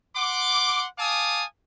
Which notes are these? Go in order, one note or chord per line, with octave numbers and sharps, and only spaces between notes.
F#5 C6 D6
F5 G#5 A5 D6 D#6